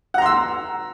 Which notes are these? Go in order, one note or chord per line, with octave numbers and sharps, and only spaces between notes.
F#5 A#5 C6 E6